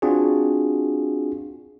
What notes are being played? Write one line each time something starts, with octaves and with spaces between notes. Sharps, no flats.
C4 D4 F4 F#4 G#4